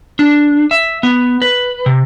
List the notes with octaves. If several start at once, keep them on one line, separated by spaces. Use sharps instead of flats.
D4
E5
B3
B4
C3